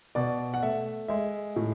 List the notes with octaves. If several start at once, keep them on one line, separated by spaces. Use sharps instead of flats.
B2 D5
F#5
A3 E5
G#3 E5
A2